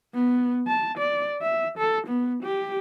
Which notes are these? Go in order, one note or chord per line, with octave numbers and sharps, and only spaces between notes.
B3
A5
D5
E5
A4
B3
G4